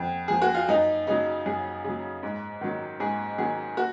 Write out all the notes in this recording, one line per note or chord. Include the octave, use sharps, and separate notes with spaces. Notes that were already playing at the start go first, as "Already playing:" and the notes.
Already playing: F2
F3 G#4
F#4
F4
F#2 D#4
C#3 F#3 D#4
F#2 G#4
C#3 F#3
G#2
D#3 F#3
G#2 G#4
D#3 F#3 G#4
F#4